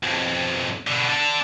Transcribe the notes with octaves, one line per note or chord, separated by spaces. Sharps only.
B1 F2
B2 D3
D4 A4